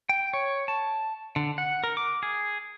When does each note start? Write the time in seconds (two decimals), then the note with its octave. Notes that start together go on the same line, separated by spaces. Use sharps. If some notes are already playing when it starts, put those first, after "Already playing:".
0.09 G5
0.33 C#5
0.68 A5
1.36 D3
1.58 F#5
1.84 A#4
1.97 D6
2.23 G#4